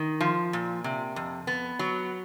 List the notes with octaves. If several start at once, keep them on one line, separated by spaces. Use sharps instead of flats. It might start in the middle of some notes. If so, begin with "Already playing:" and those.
Already playing: D#3
F3
A#2
C3
F2
B3
F#3